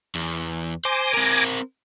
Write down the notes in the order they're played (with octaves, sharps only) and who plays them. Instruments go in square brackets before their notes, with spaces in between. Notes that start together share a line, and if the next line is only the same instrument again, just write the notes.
[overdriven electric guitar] E2
[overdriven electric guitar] C5 [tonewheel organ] G#5 D6 A#6
[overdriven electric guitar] C4 A#4